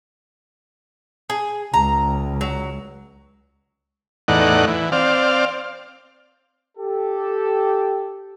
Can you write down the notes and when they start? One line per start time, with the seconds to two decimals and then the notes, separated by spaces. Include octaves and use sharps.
1.30 G#4
1.74 C#2 A#5
2.41 F#3
4.28 E2 A2 D#4 D5 F#5
4.67 E3
4.92 C4 D5 F5
6.78 G4 A4